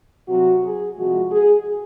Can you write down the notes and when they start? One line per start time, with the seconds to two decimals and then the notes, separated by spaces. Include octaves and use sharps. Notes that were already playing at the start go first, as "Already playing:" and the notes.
0.28 C3 F#3 F#4
0.63 G#4
0.97 C3 F3 G#3 F#4
1.32 G#4